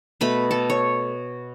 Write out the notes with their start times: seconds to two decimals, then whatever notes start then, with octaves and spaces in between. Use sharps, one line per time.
0.21 B2 A3 B4 B5
0.51 A4 A5
0.70 C#5